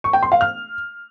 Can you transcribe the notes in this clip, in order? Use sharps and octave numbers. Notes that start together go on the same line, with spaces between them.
C#6
G5
C6
F5
F6